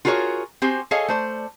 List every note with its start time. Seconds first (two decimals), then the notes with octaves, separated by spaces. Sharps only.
0.05 F4 F#4 G#4 A#4 B4 C#5
0.62 C4 F#4 G4 C5 G#5
0.91 G#4 A4 C#5 D#5 F5 G#5
1.08 A3 C5 D5